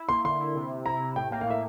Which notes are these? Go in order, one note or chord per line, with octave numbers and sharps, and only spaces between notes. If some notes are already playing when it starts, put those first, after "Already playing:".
Already playing: E4
A#3 C6
D3 C6
E4
C3
C3
E4 A#5
C3
A2 G5
A#3 G5
F5
A2 E5